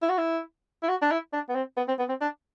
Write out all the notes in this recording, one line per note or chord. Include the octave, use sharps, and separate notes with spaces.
E4
F#4
E4
E4
F#4
D4
E4
D4
B3
C4
B3
C4
B3
C4
D4